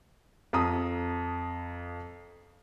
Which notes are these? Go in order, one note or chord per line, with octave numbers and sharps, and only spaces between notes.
F2 A#5 D#6